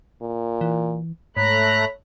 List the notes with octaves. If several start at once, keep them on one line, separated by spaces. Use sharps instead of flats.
A#2
E3
G#2 A3 C#5 A#5 B5 F#6